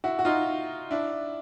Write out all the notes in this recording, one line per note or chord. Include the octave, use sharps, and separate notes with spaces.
E4 F#4
F#4
D#4 F4
D4 E4